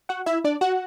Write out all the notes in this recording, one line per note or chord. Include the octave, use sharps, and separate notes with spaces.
F#4 F#5
E4 E5
D4 D5
F#4 F#5